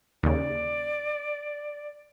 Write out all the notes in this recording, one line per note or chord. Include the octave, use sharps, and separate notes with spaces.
D#2 C#3 D5